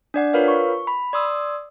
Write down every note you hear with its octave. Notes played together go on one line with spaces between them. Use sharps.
D4 D5 F#5
F4 A#4 B4 C#5 F5
C#6
B5
D5 C6 D#6 E6